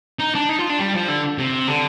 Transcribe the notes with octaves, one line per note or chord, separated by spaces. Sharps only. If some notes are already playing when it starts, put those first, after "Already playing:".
D#4
D4
D#4
F4
D4
G3
F3
D3
C3
D3